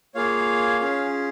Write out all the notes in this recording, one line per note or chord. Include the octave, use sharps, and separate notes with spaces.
A#3 F4 G#4 C#5 F5
C#4 F4 G#4